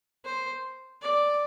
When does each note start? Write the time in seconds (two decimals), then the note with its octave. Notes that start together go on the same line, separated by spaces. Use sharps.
0.24 C5
1.01 D5